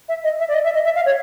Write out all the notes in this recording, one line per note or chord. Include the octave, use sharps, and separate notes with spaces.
E5
D#5
E5
D5
D#5
E5
D#5
E5
F5
C#5